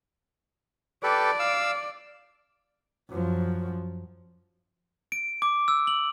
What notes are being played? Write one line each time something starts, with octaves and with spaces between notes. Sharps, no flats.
G4 A4 B4 D5
F5 E6
F#2 F3
D7
D6
E6
F#7